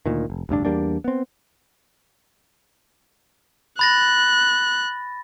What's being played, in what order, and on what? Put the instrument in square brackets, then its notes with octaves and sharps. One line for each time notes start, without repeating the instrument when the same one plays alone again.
[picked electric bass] D2 A#2 D#3
F1
F1 D2 G2 D4
E2 G3 A#3 D4
B3 C4
[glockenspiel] B5 A6 A#6 [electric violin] F#6